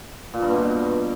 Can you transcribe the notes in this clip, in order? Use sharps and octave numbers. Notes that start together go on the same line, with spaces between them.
A#2
G2
B2